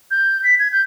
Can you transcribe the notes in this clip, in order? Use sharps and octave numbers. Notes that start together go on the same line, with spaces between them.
G6
B6
G#6
G6